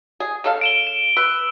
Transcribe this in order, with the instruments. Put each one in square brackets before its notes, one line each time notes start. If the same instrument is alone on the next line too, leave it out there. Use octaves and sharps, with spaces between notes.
[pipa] G#4
C#3 A4 F5
[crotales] D7 E7 G7
E7
[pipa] B4 [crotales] E6